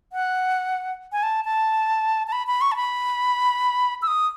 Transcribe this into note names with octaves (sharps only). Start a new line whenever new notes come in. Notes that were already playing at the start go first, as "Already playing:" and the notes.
F#5
G#5
A5
A5
A5
B5
B5
C#6
A5
B5
E6
D#6